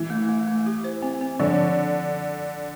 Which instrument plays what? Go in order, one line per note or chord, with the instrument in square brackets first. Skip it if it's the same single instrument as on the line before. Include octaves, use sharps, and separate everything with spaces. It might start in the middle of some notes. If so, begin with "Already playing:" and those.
Already playing: [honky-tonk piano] E3
[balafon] A3
A3
A3
G4
C5
C4
C4
[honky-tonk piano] D3 [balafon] F3